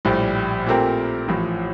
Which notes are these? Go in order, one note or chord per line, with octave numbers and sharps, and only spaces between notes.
A#1 A2 G3
A#2 A3 C4 G4 A#4
A1 A2 F3